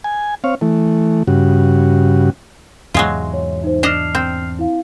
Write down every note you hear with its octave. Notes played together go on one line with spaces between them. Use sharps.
G#5
C4 C#5 F5
E3 A3
G2 C#3 F#4
E2 G#2 C3 F#3 G#3 F4
C#5
D#4 C5
D4 D#5 F6 C7 F7
C4
E4 F5